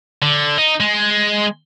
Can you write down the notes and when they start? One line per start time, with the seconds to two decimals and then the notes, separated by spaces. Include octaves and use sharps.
0.22 D3
0.58 D#4
0.80 G#3